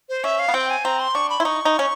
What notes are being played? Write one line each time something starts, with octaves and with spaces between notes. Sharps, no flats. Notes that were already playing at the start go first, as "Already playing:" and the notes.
C5
C#4 E5
F5
B3
C4 G5
G#5
C4 A#5
C6
D4 C#6
B5
E4 C6
D#4 C#6
D#4
C#4